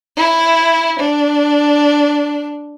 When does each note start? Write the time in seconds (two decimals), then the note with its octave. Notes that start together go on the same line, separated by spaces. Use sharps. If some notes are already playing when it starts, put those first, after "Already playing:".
0.17 E4
0.98 D4